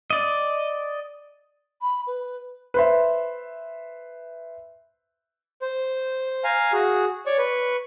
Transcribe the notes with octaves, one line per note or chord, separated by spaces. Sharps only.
D5 D#5
B5
B4
B4 C5 E5
C5
F5 G#5 A#5
F#4 G#4
C#5 D5 C#6
B4 C#6